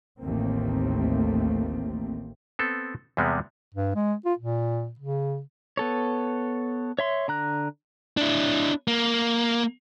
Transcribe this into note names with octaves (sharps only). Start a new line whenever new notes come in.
A1 D#2 A3 A#3 C4
B3 C4 A4
E2 C3 G3 G#3 B3
G2
G#3
F4
A#2
C#3
B3 A4 C#5
C#5 E5 C6
D3 A#5 F#6
D4 E4
A#3